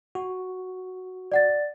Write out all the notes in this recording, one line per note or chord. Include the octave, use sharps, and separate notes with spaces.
F#4
D5 F#5 A6